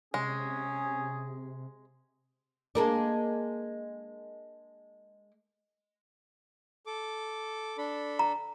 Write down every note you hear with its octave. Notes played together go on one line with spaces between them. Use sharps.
C3 G#3 C#4 G#4
G#3 A#3 D4
A4 D6
D4 A4 B5
A#5